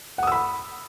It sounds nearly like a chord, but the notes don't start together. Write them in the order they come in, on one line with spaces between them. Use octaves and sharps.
F#5 D#6 E6 B5